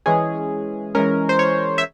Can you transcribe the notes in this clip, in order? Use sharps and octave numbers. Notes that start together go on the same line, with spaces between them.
E3 G#3 C#4 G#4
E3 G#3 C#4 A#4
C5
C#5
E5